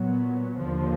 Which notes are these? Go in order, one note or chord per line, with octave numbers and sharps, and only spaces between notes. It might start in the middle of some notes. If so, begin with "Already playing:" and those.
Already playing: A#2 F#3 B3
D#2 D3 F3